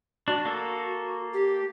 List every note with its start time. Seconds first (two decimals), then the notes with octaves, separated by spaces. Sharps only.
0.28 D4 F#4
0.45 A#3 A4
1.34 G4